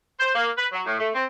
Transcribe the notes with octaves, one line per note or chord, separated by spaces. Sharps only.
C5
A#3
B4
F#3
A2
A3
C4